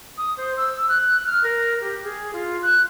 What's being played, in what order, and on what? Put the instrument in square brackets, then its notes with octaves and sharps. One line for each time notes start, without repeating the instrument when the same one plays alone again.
[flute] D#6
C5
E6
F#6
F6
A#4
G4
G#4
F4
F#6